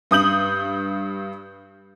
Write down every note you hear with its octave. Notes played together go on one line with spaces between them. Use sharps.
G2 D#6 G6 F#7